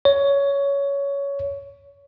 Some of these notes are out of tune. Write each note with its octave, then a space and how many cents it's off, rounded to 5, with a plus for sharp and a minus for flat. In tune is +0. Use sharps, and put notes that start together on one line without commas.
C#5 +15